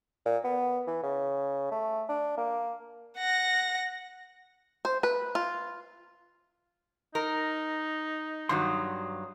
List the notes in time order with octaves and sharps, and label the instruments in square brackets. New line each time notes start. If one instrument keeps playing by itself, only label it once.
[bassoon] A#2
B3
E3
C#3
A3
D4
A#3
[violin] F#5 A#6
[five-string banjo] C5
B4
F4
[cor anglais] D#4 [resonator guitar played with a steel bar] A#4
[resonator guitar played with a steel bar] G2 D#3 F#3 [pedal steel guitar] C6 D#6